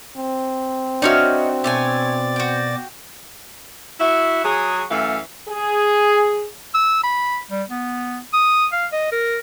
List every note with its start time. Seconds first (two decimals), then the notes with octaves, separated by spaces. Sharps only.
0.17 C4
1.02 D4 D#4 F#4 C#5 E5 F6
1.64 B2 A3 C#5 D5 G#5 A6
2.36 F#4 G5
3.99 E4 F#4 E5
4.43 F#3 F#4 G#4
4.90 F#2 E3 A3 F5
5.49 G#4
6.75 E6
7.04 B5
7.51 G3
7.70 B3
8.33 D#6
8.72 F5
8.92 D#5
9.12 A#4